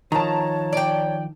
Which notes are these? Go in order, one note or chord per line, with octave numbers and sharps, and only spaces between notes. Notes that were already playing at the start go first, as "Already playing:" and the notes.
D#3 F3 C#5 A5 A#5
D5 G5